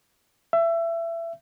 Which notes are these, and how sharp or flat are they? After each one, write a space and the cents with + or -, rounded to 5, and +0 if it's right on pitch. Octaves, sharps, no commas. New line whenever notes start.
E5 +25